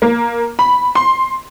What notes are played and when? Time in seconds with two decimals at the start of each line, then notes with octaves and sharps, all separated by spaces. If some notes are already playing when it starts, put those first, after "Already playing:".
0.02 A#3
0.59 B5
0.95 C6